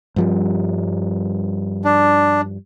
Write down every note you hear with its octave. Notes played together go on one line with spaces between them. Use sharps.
G2 F3 G3
D4